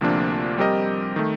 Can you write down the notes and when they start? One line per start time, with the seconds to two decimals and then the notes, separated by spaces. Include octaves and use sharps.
0.01 D2 C3 F3 A#3 D4
0.58 G3 C4 G4 A#4 D#5
1.16 D#3 A3